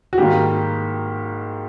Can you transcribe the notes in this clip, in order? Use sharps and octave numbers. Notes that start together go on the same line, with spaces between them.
F#4
G#2 D#3 G3 A#3 G4